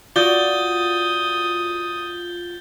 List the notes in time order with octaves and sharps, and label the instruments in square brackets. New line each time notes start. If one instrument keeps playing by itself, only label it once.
[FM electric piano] F4 [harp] F#4 D5 [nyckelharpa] D#6 [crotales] G6 A6 G7